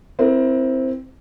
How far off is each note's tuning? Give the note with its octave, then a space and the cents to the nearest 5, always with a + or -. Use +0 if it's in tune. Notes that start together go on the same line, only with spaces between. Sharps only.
C4 +0 E4 +0 A#4 +30